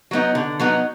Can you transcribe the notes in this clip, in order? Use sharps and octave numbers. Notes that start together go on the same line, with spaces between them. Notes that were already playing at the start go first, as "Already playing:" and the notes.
F#3 B3 D#4
D3
F#3 B3 D#4